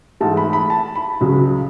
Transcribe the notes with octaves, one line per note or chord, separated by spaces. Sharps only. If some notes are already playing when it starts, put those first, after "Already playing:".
G#2 E3 A3 A5
B5
B5
A5
B5
C#2 C#3 F#3